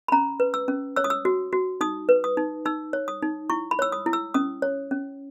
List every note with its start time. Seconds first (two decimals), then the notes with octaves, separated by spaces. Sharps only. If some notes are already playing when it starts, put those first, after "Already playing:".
0.08 B5
0.12 C#4 A#5
0.40 B4
0.54 E6
0.68 C#4
0.96 C#5 E6
1.04 D#6
1.10 E6
1.25 F#4
1.52 F#4
1.81 D#4 D#6
2.09 B4
2.24 D#6
2.37 D#4
2.65 D#4 E6
2.93 C#5
3.08 D#6
3.22 D#4
3.50 E4 C#6
3.71 B5
3.79 C#5 E6
3.92 D#6
4.06 E4
4.13 E6
4.34 C#4 D#6
4.62 C#5
4.91 C#4